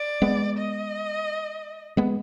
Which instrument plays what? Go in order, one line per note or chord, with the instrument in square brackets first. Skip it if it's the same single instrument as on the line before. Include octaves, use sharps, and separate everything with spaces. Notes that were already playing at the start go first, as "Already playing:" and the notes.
Already playing: [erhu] D5
[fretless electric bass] G#3 B3
[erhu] D#5
[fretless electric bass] G#3 B3